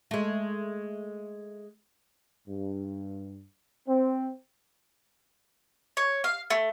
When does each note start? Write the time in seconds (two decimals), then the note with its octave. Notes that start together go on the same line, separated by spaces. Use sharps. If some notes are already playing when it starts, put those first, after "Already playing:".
0.11 G#3 A3
2.48 G2
3.88 C4
5.97 C#5
6.24 F5
6.50 A3